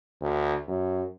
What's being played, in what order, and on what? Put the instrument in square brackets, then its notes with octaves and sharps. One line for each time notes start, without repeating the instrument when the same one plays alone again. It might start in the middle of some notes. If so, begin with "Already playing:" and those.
[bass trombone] D2
F#2